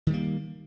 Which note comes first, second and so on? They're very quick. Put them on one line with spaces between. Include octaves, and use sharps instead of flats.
D#3 G3 A#3